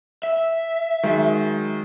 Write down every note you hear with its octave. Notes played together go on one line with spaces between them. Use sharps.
E5
D#3 F#3 G#3